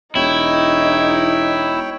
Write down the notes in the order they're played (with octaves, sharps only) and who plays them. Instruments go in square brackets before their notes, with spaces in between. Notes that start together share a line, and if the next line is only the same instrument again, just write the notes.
[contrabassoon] E1 [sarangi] D#4 [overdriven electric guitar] E4 [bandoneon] C#5 G5